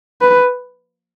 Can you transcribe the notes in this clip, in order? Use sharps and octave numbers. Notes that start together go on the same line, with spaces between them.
B4